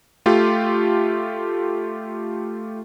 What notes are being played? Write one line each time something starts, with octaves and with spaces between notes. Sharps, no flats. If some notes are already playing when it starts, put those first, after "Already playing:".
A3 F4 G4